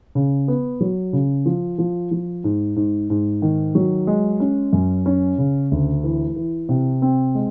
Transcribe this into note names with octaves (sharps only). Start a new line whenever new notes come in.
C#3
B3
F#3
C#3
F3
F3
F3
G#2
G#2
G#2
D#3
F#3
G#3
C#4
F#2
C#4
C#3
D2
E3
E3
C3
C4
G#3